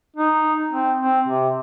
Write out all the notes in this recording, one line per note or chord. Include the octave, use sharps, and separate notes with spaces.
D#4
C4
C4
C3